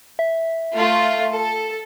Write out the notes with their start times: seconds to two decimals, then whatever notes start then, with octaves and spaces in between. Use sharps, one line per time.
0.19 E5
0.74 A3 F4
1.34 A4